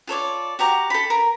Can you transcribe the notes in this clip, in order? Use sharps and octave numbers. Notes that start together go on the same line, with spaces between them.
F4 A4 C#5 D5
F#4 G4 A#5 D6
A4 B5
A#4